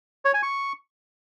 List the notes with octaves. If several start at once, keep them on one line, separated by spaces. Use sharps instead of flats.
C#5
G#5
C#6